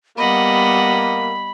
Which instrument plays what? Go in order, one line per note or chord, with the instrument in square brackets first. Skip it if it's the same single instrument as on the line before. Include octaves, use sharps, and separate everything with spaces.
[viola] G3 B3 [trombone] A#3 [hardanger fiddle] D#5 F#5 [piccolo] B5